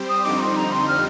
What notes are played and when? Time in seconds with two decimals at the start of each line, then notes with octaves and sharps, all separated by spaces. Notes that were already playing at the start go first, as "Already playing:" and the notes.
Already playing: G3 C4 G4 C5
0.09 D#6
0.24 F2 D3 G3 C4 D#4 D6
0.40 C6
0.56 A#5
0.72 C6
0.88 F6